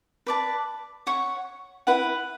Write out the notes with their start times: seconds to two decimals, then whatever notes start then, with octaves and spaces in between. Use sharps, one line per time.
0.27 B4 D5 A5
1.07 C#5 F#5 C#6
1.87 E4 B4 F#5